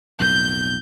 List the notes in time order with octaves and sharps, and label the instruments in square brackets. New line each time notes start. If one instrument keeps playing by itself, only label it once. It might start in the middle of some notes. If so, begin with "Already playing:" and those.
[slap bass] B1 F2 A2 [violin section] G6